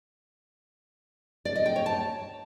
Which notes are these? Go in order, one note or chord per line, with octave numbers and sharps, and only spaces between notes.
D5
D#5
G5
C#5
A5